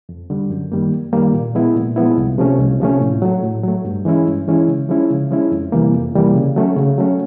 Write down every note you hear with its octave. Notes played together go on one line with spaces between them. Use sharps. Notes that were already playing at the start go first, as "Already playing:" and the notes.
F2
D3 G3
F#2
D#3 G3 A#3
F#2
D#3 G3 A#3
A#2
F3 G#3 B3 E4
A#2
F3 G#3 B3 E4
C2
C3 F3 A3 C#4
C2
C3 F3 A3 C#4
A2
F#3 A3
A2
F#3 A3
G2
E3 G#3 C#4 E4
G2
E3 G#3 C#4 E4
C#3
F3 G#3 C#4 E4
C#3
F3 G#3 C#4 E4
F2
C3 E3 G3 A#3
F2
C3 E3 G3 A#3
C#3
F#3 A3 C#4
C#3
F#3 A3 C#4